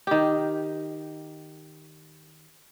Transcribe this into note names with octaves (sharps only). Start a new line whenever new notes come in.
D#3 G4